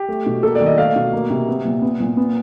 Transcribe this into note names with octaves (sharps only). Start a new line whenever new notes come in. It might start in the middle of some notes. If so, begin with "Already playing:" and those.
Already playing: G4
A3
B2
A#3 A4
D5
D#3
D#5
A3 F5
B2
A#3
C3
B3
A#2
B3
A#2
B3